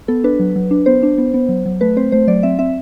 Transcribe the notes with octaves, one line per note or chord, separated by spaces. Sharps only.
B3 A4
D4 B4
F#3
F#3
D4
B3 C5
D4
B3
B3
F#3
F#3
A3 B4
C4 C5
A3 C5
F#3 D5
C4 E5
C4 E5